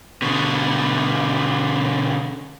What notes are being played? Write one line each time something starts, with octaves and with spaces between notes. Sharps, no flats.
B2 D3